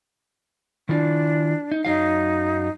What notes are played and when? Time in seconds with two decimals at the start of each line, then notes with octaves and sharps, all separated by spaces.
0.89 D#3 D4 E4 F4
1.72 D#4
1.85 F#2 F#3 D#4 F5